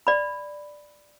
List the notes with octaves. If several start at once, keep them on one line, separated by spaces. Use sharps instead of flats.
D5 B5